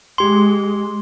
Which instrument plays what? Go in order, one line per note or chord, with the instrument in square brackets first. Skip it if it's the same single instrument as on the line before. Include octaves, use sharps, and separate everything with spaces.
[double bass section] G#3 [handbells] G4 C6